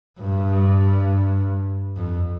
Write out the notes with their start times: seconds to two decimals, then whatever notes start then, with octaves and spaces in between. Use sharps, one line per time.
0.21 G2
1.97 F2